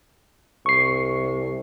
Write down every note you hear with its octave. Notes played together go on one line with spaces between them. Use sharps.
C2 C#6 C7